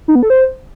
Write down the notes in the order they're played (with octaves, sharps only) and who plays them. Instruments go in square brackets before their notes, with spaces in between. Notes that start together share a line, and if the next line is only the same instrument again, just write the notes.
[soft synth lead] D#4
B3
A4
C5